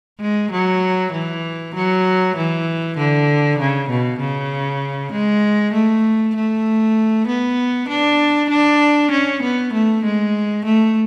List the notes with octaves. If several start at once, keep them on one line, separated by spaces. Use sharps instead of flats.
G#3
F#3
E3
F#3
E3
D3
C#3
B2
C#3
G#3
A3
A3
B3
D4
D4
C#4
B3
A3
G#3
A3